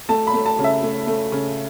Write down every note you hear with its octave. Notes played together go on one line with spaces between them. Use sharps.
A3 A5
B5
A3
A5
C#3
E5
A3
A3
C#3